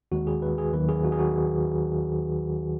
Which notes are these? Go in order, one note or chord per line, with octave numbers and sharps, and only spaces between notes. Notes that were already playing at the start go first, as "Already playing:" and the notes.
D#2 D#3 G#3 F#4
G#4
B4
G#4
D#2 D#3 F#3 B4
G#4
F#4
G#4
F#4